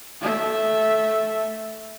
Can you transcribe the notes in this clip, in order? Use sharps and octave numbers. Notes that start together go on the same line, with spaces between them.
A3 E5